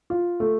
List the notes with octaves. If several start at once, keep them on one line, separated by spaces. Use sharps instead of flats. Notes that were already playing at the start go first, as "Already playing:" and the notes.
F4
A3